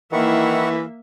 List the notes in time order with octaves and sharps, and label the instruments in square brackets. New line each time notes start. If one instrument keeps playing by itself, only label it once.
[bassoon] D#3 [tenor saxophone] E3 [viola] A#3 E5 [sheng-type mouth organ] E4 F#5 C#6